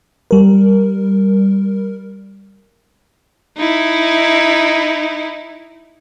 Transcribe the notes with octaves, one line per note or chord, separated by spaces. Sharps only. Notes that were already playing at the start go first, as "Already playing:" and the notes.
G3 A#4
D#4 E4